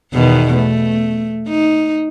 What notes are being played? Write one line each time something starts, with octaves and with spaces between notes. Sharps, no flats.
E2 B2 D#3
A3
D#4